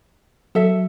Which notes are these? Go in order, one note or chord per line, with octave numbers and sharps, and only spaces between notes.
F#3 A4 E5